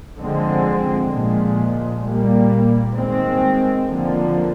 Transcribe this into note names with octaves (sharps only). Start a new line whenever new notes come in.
D3 F3 G#3 C4
A#2 F3 G#3
A#2 G3 A#3
D#3 G#3 C4
D3 F3 A#3